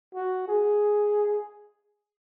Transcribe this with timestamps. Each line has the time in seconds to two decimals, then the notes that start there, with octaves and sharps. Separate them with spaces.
0.14 F#4
0.48 G#4